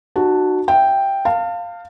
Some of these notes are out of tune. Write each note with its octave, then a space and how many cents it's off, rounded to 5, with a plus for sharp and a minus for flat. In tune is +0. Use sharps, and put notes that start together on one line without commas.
D#4 -40 F#4 +0 A5 +0
E5 +0 G5 +0
F5 +0 A5 +35